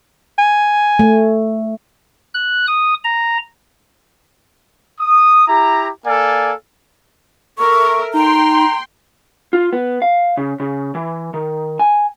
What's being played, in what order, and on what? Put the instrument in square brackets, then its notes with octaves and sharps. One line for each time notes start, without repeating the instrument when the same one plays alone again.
[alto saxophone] G#5
[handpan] A3
[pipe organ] F#6
D#6
A#5
[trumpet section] D#6
E4 G4 A#5
A#3 A4 D5 F5 G#5
[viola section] A4 A#4 E5 [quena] C#6
[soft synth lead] D#4 [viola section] G5 C6 [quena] A#5
[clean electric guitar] F4
B3
F5
C#3
C#3
E3
D#3
G#5